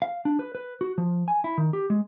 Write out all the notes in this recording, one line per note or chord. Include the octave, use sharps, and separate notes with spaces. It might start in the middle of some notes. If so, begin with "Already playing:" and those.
F5
D4
B4
B4
F#4
F3
G#5
E4
D#3
G4
G#3